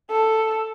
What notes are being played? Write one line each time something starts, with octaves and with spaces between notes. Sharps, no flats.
A4